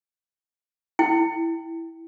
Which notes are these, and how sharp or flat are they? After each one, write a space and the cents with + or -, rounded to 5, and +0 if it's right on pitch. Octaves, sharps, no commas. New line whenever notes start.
E4 +0 G5 +0